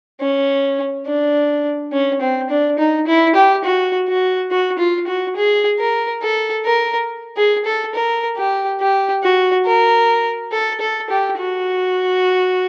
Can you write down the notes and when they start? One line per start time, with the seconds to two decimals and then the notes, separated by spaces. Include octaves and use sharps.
0.20 C#4
1.06 D4
1.92 C#4
2.21 C4
2.50 D4
2.79 D#4
3.07 E4
3.35 G4
3.64 F#4
4.08 F#4
4.51 F#4
4.78 F4
5.07 F#4
5.36 G#4
5.79 A#4
6.22 A4
6.65 A#4
7.37 G#4
7.65 A4
7.95 A#4
8.37 G4
8.81 G4
9.23 F#4
9.66 A#4
10.52 A4
10.80 A4
11.10 G4
11.38 F#4